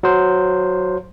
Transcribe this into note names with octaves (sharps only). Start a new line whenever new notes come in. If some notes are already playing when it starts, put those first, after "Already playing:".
F#3 C5